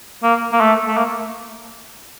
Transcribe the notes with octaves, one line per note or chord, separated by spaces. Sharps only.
A#3
A#3
A3
A3
A#3